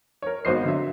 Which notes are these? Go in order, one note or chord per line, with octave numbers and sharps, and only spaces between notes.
A#4 C#5
G#1 B3 F#4 C5 D#5 C7
D3 F#3 E5